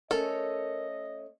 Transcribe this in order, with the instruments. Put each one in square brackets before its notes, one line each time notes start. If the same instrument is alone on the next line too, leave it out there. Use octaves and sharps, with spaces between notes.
[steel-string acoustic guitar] A3 C#4 C#5 [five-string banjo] A4 [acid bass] A#4 [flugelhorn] D#5